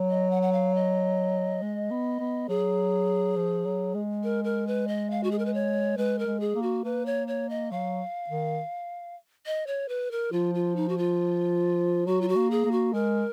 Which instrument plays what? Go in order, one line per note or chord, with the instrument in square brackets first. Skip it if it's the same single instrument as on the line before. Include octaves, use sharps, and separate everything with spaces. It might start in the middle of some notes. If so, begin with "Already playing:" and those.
Already playing: [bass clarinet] F#3
[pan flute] D#5
F#5
F#5
F5
D#5
[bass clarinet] G#3
B3
B3
[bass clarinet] F#3 [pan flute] G#4
[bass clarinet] F3
F#3
G#3
[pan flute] A#4
A#4
B4
D#5
F5
F#4
G#4
A#4
B4
C#5
[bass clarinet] G#3 [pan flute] B4
[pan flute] A#4
[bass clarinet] G#3
[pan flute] G#4
[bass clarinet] A#3
[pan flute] F#4
[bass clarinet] A#3 [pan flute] B4
[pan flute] C#5
C#5
D#5
[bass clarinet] F#3 [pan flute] F5
[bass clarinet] D#3
[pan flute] D#5
C#5
B4
A#4
[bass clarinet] F3 [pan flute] F4
[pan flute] F4
D#4
F#4
F4
[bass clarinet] F#3 [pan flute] F#4
[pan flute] F4
F#4
[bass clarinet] A#3
[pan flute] G#4
[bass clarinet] A#3
[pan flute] F#4
[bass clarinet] G#3 [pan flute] A#4